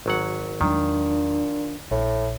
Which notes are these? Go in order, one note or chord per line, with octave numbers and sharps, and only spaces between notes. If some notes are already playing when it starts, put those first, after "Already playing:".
G#1 F#3 F#5
E2 A#2 D#3 F#3 G#3 D4
A#1 A2